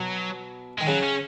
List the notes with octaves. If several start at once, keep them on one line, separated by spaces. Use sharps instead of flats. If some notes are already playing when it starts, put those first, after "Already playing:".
Already playing: B2 F#3
D#3 G#3
C#3 F#3
C#4